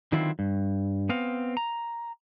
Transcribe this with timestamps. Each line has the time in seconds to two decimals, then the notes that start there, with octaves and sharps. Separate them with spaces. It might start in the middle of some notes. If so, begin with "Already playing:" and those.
0.12 D3 D#3 F#3 C4 E4 F4
0.39 G2
1.09 B3 C4 F5
1.57 A#5